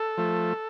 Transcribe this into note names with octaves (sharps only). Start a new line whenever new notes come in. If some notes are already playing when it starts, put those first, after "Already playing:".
Already playing: A4
F3 A3